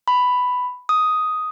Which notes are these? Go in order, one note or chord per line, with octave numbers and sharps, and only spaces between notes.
B5
D#6